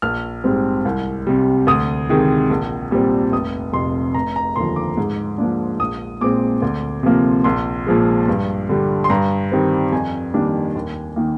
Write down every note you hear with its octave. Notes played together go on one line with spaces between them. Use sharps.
A#1 F6
G#2 G3 C4
C2
C3 G3
D2 D#6
C3 D#3 G#3
A#1
A#2 G3 C4
F1 D#6
F2 C3 C6
F1 A#5
A#5
D#2 D3 F3 C6
D6
G#2
F3 A#3 D4
A#1 D#6
A#2 G#3 C4 D6
D2
C3 F3 A#3
A#1 C6
A#2 F3 G#3
G2
D3 G3
C6
G2 A#5
D#3 G3 C4
F2 G#5
D#3 G3 A#3 D4
D#2
D#3 A#3